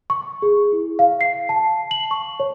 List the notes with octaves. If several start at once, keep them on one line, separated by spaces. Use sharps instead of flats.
C#6
G#4
E4
F5
C7
A5
F#7
C#6
C#5